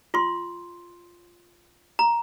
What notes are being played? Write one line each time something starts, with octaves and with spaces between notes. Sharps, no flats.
F4 C6
A#5